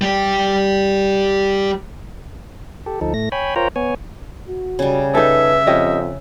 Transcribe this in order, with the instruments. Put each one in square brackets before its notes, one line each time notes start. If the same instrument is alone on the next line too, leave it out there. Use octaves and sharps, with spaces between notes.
[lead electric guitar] G3 G4
[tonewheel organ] G4 A4
D2 F3 D#4 A4
A2 A3 A#6
C#5 G5 G#5 B5
F4 A#4 C5 C#5 G5 A#5
B3 C#5 G#5
[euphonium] F#4
[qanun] C#3 G3
[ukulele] D#4 G#4 A4 [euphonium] B4 [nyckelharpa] E5
[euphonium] F2 [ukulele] C#4 G4 D#5